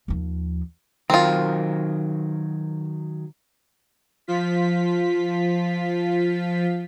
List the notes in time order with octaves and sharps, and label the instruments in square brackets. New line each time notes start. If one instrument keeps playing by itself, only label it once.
[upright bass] D#2 F3
[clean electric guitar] D#3 F#3 A#4 [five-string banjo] C4 F4
[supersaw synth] F3 F4 B6